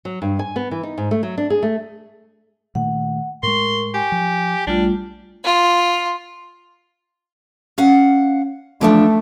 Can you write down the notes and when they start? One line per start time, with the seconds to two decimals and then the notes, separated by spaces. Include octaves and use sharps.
0.05 F#3
0.22 G2
0.39 G#5
0.56 B3
0.71 E3
0.83 D#4
0.98 G#2
1.11 A3
1.23 F#3
1.38 D4
1.50 G#4
1.63 A3
2.75 A#2 D#3 A3 F#5
3.43 A2 G#3 A#4 C6 C#6
3.94 G4 G#5
4.12 F3
4.67 A#1 G3 A3 D4 F4
5.44 F4
7.78 C#4 F5 F#5
8.81 E3 F3 A3 D4